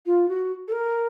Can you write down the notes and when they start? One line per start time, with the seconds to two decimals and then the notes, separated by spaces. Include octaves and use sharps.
0.06 F4
0.28 F#4
0.68 A4
0.72 A#4